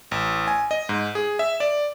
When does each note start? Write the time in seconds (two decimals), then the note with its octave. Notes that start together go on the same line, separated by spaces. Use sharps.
0.11 A1
0.48 G#5
0.71 D#5
0.89 G#2
1.15 G#4
1.39 E5
1.60 D5